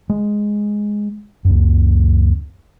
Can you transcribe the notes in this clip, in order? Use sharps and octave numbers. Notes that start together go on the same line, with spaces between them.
G#3
C#2 F#2